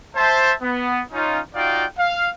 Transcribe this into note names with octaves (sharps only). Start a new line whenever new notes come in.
C5 E5 A5
B3
C#4 D#4 F4
D#4 F4 F#4 D5 F5 G5
F5